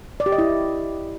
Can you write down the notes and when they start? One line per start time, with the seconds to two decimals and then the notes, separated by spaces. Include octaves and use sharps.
0.20 D5
0.26 G4
0.32 D#5
0.38 E4